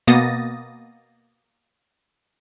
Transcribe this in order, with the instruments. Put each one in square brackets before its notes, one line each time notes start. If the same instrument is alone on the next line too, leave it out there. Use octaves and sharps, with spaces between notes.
[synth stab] B2 A#3 B3 D#6 A6 A#6